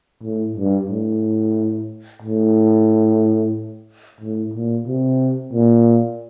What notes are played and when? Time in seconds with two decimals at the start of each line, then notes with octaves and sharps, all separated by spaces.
0.23 A2
0.57 G2
0.90 A2
2.22 A2
4.21 A2
4.54 A#2
4.87 C3
5.53 A#2